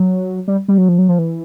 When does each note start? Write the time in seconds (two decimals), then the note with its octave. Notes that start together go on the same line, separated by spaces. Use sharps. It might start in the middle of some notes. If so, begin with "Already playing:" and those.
Already playing: F#3
0.48 G3
0.68 G3
0.78 F#3
0.89 F3
0.98 F#3
1.09 F3
1.19 E3